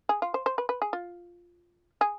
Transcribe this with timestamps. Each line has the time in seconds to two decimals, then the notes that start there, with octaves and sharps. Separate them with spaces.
0.09 G#4
0.22 F4
0.34 C5
0.46 C5
0.58 B4
0.69 B4
0.82 G#4
0.93 F4
2.01 G#4